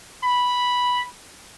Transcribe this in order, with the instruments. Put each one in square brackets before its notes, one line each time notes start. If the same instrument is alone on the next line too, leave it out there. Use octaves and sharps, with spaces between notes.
[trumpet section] B5